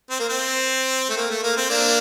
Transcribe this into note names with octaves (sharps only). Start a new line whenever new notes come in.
C4
A#3
C4
A3
A#3
A3
A#3
C4
A#3 D4